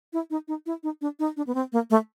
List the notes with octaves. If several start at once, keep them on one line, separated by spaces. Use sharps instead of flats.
E4
D#4
D#4
E4
D#4
D4
D#4
D4
B3
C4
A#3
A3